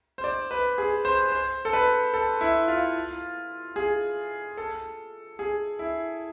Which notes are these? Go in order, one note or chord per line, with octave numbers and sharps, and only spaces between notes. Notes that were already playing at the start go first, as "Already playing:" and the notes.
C5
D5
B4
G#4
C5
C5
A4
B4
A4
E4
F4
G#4
A4
G#4
E4